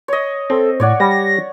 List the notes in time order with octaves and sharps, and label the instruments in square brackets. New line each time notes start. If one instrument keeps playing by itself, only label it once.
[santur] C#5 D#5
[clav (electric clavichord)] C4 [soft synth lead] A4
[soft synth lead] A2 [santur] C#5 D5 F#5
[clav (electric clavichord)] G3 [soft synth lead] A#6